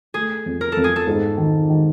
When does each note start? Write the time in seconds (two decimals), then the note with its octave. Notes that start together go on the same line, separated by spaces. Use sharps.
0.14 A3 G#4
0.46 F2
0.61 A#4
0.72 F2 A4
0.84 G#4
0.96 A4
1.07 G#2
1.37 D#3
1.70 D#3